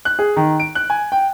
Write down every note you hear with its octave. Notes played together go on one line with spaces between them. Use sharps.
F#6
G#4
D#3
D7
F#6
G#5
G5